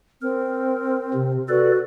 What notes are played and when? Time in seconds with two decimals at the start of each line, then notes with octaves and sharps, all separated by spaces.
0.22 C4 A#4
1.14 C3
1.49 F#4 A4 B4 D5